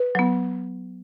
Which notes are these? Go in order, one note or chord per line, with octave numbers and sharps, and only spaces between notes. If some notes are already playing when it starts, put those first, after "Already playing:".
Already playing: B4
F#3 B3